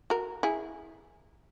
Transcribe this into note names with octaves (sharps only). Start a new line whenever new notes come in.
F#4 A#4
E4 G#4